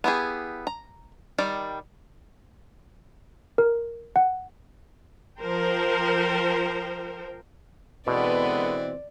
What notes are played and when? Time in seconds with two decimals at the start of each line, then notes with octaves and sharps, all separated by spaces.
0.04 B3 E4 G4 G#4
0.67 A#5
1.38 D#3 G3 D5
3.58 A#4
4.16 F#5
5.38 F3 A#4 C5 G5
8.07 B2 D3 E3 G#3 B3 C4 D5